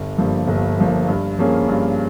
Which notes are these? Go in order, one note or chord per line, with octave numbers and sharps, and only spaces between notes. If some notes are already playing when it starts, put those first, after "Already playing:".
Already playing: G1
G2 F3 A#3
G1
G2 F3 A#3
G2
F3 A#3 C#4 G#4
G2